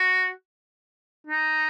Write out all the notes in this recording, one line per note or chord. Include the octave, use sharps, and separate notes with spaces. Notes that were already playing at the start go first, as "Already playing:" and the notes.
Already playing: F#4
D#4